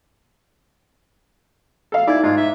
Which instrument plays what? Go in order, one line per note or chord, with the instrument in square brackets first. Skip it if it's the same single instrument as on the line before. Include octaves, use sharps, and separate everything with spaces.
[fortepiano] A4 F5
[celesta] D#4 G#6 [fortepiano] E4 [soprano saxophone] D5
[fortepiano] G#2 [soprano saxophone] F4
[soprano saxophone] E5